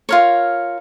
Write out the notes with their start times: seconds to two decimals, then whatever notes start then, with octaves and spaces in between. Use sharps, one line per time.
0.09 F4 A#4 C#5